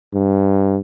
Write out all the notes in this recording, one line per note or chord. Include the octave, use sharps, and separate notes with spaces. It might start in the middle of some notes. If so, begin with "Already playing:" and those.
G2